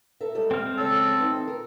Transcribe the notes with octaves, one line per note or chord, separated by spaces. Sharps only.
A4 A#4 E5
G3 G#3 A4
C4 F6
C#3 G#3 A4
E3 D#4
A#4